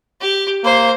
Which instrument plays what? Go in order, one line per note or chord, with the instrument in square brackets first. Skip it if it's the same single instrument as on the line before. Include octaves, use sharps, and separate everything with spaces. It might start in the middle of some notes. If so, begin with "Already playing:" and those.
[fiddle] G4
[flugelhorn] A#3 [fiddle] C5